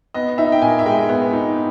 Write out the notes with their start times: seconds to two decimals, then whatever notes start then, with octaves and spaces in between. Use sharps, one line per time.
0.14 B3 D#5
0.38 D#4 E5
0.52 G5
0.62 A#2 G#5
0.79 E5
0.86 G#3 G5
1.09 B3
1.33 D#4